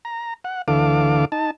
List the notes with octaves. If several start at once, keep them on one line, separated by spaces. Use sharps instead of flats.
A#5
F#5
D2 D3 E3 A4 F5 D6
D#4 A5